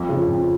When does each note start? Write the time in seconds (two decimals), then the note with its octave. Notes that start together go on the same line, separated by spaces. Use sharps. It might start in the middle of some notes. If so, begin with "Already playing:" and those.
Already playing: F2
0.09 C#3 F3
0.27 F2